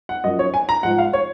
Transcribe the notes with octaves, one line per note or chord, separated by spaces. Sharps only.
F#5
F#2 F3 D#5
C#5
G#5
A#5
G#2 F3 F#5
F5
C#5